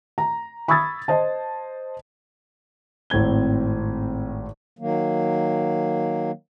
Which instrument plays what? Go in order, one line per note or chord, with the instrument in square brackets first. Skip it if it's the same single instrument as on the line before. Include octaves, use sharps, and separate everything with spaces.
[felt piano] A#5
B5 C#6 D#6 E6 G#6 A6
C5 D#5 A5
[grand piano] G#1 A2 C4 G#6 G7
[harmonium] D#3 F#3 A#3